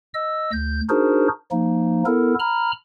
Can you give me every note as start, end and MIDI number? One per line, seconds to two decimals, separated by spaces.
0.14 0.51 75
0.14 0.51 88
0.53 0.81 38
0.53 0.81 91
0.89 1.28 62
0.89 1.28 63
0.89 1.28 66
0.89 1.28 68
0.89 1.28 70
0.89 1.28 72
1.51 2.03 53
1.51 2.03 58
1.51 2.03 63
2.06 2.34 59
2.06 2.34 64
2.06 2.34 69
2.06 2.34 70
2.40 2.72 82
2.40 2.72 83
2.40 2.72 89